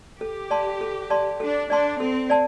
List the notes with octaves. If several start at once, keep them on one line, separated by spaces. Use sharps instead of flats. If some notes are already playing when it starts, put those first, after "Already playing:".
G4 A4
D5 A5 C6
A4
D5 A5 C6
D4 A4
D4 D5 A5 C6
C4 A4
D5 A5